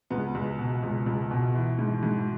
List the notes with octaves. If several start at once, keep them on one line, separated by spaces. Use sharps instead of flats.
C#2 B3
C#2
B2
C#2
C#2
B2
E3
G#2
G#2